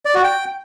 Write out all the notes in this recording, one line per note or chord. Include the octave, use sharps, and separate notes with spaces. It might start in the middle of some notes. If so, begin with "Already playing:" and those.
D5
F#4
G5